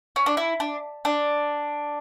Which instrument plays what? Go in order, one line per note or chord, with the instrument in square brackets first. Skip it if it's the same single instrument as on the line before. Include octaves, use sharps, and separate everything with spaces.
[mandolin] C#4
D4
E4
D4
D4